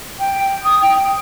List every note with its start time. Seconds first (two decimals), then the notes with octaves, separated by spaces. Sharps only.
0.19 G5
0.63 D#6
0.81 G5